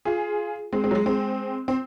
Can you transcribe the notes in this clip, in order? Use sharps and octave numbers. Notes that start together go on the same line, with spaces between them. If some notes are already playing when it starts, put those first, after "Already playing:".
F4 G#4
G#3 C4
G#3 C4
F#3
G#3
G#3 C4
C4